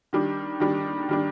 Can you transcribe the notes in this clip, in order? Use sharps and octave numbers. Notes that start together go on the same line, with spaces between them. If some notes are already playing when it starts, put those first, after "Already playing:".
D#3 G3 D4
D#3 G3 D4
D#3 G3 D4